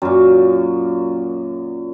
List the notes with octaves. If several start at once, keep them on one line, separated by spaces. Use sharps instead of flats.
F#2 A#2